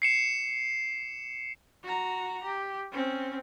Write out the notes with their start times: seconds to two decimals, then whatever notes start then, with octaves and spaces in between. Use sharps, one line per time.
0.02 C7 C#7 E7
1.83 F#4 A#5
2.43 G4
2.92 C4 C#4